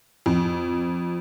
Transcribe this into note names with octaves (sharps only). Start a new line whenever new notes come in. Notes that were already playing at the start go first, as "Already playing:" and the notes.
F2